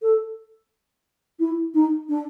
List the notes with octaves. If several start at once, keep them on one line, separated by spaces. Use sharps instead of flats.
A4
E4
D#4
D4